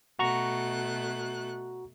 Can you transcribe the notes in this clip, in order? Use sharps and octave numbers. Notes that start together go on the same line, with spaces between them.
B2 A3 F#4 A#5 C#6 F#6